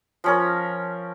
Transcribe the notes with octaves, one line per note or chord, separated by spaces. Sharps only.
F3 C#4 A#4